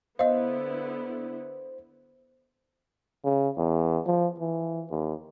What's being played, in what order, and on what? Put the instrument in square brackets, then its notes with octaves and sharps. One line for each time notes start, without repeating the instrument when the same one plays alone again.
[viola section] D3 B3 E4 [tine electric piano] C5 [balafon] D#5 F5
[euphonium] C#3
E2
F3
E3
D#2